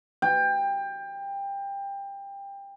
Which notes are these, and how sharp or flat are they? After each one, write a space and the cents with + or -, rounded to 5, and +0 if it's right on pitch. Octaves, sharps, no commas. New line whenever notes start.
G5 +20